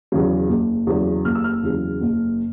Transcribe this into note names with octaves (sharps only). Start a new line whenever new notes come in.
E2 C#3 F#3
F#1
E2 C#3 F#3
F#1 F6
E6
F6
E2 C#3 F#3
F#1